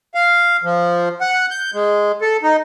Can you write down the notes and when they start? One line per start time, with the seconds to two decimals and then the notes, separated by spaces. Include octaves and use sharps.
0.15 F5
0.63 F3
1.21 F#5
1.51 G6
1.74 G#3
2.21 A4
2.43 D#4